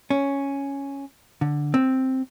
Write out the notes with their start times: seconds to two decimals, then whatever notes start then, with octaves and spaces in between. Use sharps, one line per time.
0.10 C#4
1.41 D3
1.74 C4